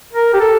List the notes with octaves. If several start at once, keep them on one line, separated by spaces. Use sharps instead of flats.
A#4
G4
A4